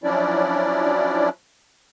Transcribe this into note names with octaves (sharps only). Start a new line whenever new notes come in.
F3 F#3 C#4 D4 E4 D5